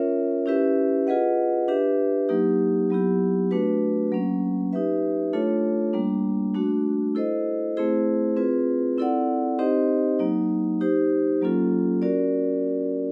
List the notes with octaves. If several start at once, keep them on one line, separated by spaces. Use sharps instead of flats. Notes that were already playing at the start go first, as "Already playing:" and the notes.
Already playing: C#4 F4 A#4 C#5 E5
C#4 E4 G4 B4 E5
F4 G#4 B4 D#5 F#5
D4 G4 B4 E5
F#3 A#3 D#4 G4
F#3 B3 E4 G4
A3 D4 F#4 B4
F#3 A#3 C#4
D#4 G4 B4 E5
A3 D4 F4 A4 C#5
G3 A#3 D4
A3 D4 F#4
E4 A4 C5 D#5
A3 C4 E4 G#4 C5
C4 F4 G#4 B4
C4 E4 A4 D5 F#5
C4 D#4 G4 C5 D#5
F#3 A#3 D#4
D#4 G4 C5
F#3 A#3 C#4 F4 A4
C#4 F#4 A#4 D5